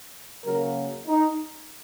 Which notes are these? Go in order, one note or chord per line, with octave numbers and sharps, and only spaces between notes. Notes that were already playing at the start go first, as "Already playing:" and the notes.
C#3 F#3 A#3 A#4
D#4